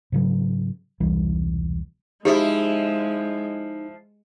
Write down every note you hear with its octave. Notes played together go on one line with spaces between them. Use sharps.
G#2 C#3 F#3
E1 C2 E3 G3
F3 G#3 D#4 E4 G4 G#4 D#6